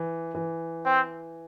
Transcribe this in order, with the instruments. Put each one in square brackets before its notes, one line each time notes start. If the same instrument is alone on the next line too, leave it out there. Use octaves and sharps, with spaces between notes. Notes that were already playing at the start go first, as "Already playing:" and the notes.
Already playing: [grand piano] E3
E3
[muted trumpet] C4